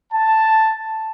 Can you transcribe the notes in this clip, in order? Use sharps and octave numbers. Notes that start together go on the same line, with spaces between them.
A5